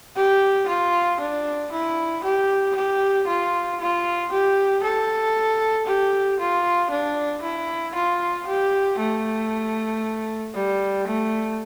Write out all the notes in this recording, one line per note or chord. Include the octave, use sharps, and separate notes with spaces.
G4
F4
D4
E4
G4
G4
F4
F4
G4
A4
G4
F4
D4
E4
F4
G4
A3
G3
A3